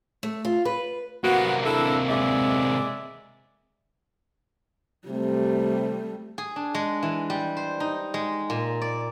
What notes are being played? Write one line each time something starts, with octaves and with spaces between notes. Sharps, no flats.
A3
F4
B4
C3 A#3 B3 F#4
D4 E4 A4
G#3 D5 E5
C3 G3 A3
G#4
D4
G#3
E3
G3
C5
D#4
G#3
A#2
D5